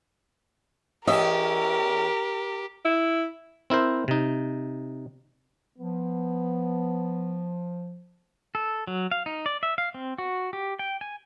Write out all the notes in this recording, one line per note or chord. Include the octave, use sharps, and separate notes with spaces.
E2 C#4 G4 A#4 D#5 E5
E4
C4 E4 A#4 C5
C3 D#4
F3 B3
A4
F#3
F5
D#4
D5
E5
F5
C4
F#4
G4
G5
G#5